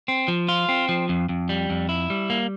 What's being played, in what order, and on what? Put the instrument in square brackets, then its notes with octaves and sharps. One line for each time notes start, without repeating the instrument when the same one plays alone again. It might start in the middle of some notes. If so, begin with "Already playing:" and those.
[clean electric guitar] C4
F3
F4
C4
F3
F2
F2
G3
F2
E4
G3
A#3